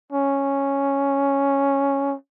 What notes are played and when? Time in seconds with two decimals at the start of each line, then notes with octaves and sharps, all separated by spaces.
0.12 C#4